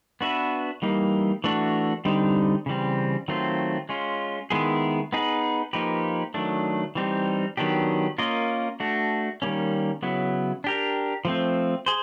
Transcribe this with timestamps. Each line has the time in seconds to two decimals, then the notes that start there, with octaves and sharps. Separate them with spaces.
0.21 B3 D4 F#4 B4 E5
0.82 E3 G3 A#3 D#4
1.44 E3 A3 D4 F#4
2.05 D3 G3 C4 D#4
2.66 C#3 E3 G3 C4
3.28 D#3 F#3 A3 C4 F4
3.89 G#3 C#4 F4
4.50 D#3 G#3 B3 E4 G#4
5.13 B3 D#4 G#4 B4
5.73 F3 A#3 D#4 G4 B4
6.34 D#3 F#3 A3 D4
6.95 E3 G3 C4 D#4
7.57 D#3 F#3 B3 D4 G4
8.18 A#3 C#4 F4 A#4 D#5
8.80 A3 D4 F#4
9.42 D#3 G3 A#3 C#4
10.02 C#3 F#3 B3 E4
10.64 D4 G4 A#4
11.25 F3 A3 C4
11.86 G#4 C5